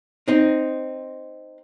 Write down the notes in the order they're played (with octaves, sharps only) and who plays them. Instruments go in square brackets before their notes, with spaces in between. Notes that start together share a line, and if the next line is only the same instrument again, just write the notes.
[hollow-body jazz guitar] C4 D#4